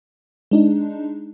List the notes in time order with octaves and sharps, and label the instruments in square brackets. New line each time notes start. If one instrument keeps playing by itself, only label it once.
[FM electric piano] G#3 D4 D#4